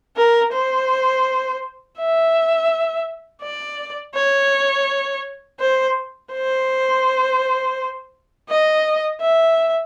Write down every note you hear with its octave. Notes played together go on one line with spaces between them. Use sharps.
A#4
C5
E5
D5
C#5
C5
C5
D#5
E5